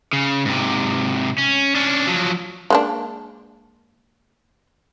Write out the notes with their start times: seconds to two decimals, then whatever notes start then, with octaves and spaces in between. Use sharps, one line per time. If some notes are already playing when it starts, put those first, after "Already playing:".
0.13 C#3
0.45 G#2 C3
1.38 C#4
1.75 C#4 D4
2.07 F3 F#3
2.70 G#3 A#3 D4